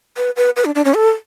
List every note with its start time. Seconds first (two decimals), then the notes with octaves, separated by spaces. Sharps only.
0.17 B4
0.36 B4
0.56 B4
0.65 D4
0.75 D4
0.85 C#4
0.94 A4